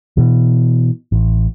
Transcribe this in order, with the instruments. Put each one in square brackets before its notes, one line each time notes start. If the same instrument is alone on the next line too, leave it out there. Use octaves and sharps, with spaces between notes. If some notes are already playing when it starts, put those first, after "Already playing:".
[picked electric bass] B2 E3
A1